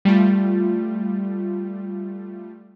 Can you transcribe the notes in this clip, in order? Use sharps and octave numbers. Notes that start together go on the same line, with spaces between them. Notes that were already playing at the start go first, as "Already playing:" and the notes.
G3 A3 F4